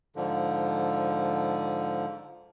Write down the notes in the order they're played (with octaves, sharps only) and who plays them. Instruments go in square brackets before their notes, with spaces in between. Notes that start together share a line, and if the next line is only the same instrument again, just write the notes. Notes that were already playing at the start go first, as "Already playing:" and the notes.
[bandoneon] G#2 D3 F3